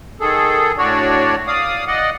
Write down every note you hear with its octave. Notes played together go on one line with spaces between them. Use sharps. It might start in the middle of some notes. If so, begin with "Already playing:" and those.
D#3 G#4 A4
A2 D4 F#4 C#5 D5
D5 F5 D#6
D5 D#5 F#5